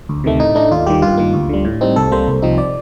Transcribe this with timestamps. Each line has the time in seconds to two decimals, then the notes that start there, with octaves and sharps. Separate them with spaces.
0.09 D2
0.24 C3 D#3 A3
0.39 A2 D#4
0.55 A3 D4 D#4
0.71 D#2 F4
0.86 D#3 G3 G4
1.02 G2 F4
1.17 D#3 A#3
1.34 D2
1.49 D3 G3
1.65 A2
1.81 G3 C4 D#4
1.96 C2 A4
2.12 C3 G3 A#3 C5
2.28 C2
2.42 C3 F3 C4 D#4
2.58 D5